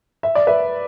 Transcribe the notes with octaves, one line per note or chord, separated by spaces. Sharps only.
E5
D5
B4 E5